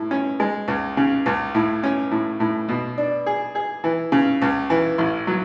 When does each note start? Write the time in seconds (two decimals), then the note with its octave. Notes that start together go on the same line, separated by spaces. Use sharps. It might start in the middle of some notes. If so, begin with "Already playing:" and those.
Already playing: A2
0.11 C#4
0.40 G#3
0.68 C#2
0.97 C#3
1.26 C#2
1.55 A2
1.83 C#4
2.11 A2
2.40 A2
2.68 B2
2.98 D4
3.26 G#4
3.55 G#4
3.84 E3
4.12 C#3
4.42 C#2
4.70 E3
4.98 A1
5.27 F#3